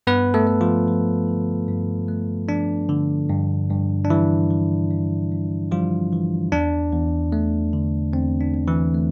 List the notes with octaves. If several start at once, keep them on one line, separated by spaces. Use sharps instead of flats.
G2 B3 B4
A3 A4
A3
F3 F4
F3
D3
G2
A3
F3 D4
D3
G2
G2
D4
E3 G3 E4
E3
G2
G2
F3 G3 F4
E3
E2 D4
E2
A3
D3
E2 C4
D4
E2
E3 E4
A3